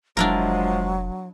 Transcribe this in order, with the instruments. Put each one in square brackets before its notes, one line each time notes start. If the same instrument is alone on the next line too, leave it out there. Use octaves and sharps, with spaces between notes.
[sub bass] F1 [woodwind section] F3 G#3 [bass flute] F#3 [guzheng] D4 E4 A#4